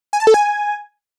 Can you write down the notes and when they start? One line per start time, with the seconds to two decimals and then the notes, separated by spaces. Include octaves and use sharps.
0.13 G#5
0.20 A5
0.27 A4
0.34 G#5